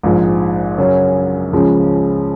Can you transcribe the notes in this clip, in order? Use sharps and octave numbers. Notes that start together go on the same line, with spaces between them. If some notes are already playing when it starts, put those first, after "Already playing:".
A#1 G#2 F3 G#3
F#2 C#3 F#3 C#4
C#2 C#3 F3 G#3